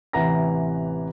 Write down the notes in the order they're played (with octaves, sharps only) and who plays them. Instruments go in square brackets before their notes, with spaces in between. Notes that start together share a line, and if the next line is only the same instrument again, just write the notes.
[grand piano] A1 C3 E3 F#5 A#5 A#6